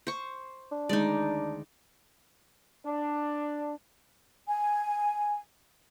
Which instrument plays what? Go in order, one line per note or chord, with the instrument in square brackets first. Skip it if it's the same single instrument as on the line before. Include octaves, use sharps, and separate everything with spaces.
[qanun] C5 C#6
[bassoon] D4
[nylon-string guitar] D2 D#3 G#3 [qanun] D#4 D5
[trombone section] D4
[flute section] G#5